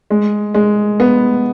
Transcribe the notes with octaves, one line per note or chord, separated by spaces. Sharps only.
G#3
G#3
B3